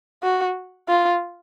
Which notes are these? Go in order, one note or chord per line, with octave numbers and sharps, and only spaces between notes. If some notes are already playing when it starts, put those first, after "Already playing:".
F#4
F4